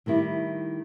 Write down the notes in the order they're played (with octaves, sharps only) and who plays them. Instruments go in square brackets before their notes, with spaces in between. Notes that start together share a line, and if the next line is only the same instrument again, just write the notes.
[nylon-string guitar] A2 D#3 G3 E4